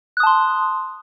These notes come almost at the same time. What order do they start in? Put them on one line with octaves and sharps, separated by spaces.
F#6 D#6 A5 C6